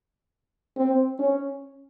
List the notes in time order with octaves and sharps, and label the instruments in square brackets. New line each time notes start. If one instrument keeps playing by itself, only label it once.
[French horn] C4
C#4